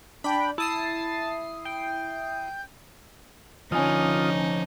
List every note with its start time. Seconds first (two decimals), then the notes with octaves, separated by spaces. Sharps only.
0.24 D4 G5 B5
0.58 E4 A5 D#6 C7
1.65 G5
3.72 D3 F3 C#4 D#4 F4 G#5 D#6